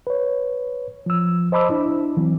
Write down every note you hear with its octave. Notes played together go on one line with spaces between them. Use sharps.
B4 C#5
F3 E6
C5 D#5 A5 B5 D6 E6
D4 E4
E3 F#3 C4